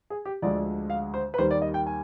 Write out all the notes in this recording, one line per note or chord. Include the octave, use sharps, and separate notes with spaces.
G#4
G4
D2 D3 F3 G#3 D5
F5
C5
B4
D#2 D#3 G3 C5
D5
D#5
G5
G#5